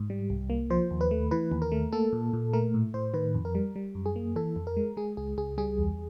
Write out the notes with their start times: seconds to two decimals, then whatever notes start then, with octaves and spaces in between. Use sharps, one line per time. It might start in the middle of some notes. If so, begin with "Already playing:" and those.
Already playing: G#2
0.10 G3
0.30 C2
0.50 A#3
0.70 F3 C5
0.91 D#2
1.01 B4
1.11 A3
1.31 E3 B4
1.52 D#2
1.62 A#4
1.72 A3
1.92 A#3 A4
2.13 A#2
2.33 A#2
2.53 A3 A#4
2.74 A2
2.94 A2 C5
3.14 D#3 B4
3.34 F2
3.45 A#4
3.55 G3
3.76 G3
3.95 F#2
4.06 G#4
4.16 A#3
4.36 E3 A4
4.56 F2
4.67 A#4
4.77 G#3
4.97 G#3 G#4
5.17 C#2 G#4
5.38 C#2 G#4
5.58 G3 G#4
5.78 E2